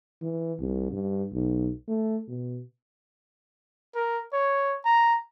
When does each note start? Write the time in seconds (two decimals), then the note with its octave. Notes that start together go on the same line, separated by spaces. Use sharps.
0.22 E3
0.60 C2
0.92 G2
1.33 B1
1.88 A3
2.28 B2
3.95 A#4
4.33 C#5
4.85 A#5